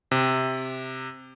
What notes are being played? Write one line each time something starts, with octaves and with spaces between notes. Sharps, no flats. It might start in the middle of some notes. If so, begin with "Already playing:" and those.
C3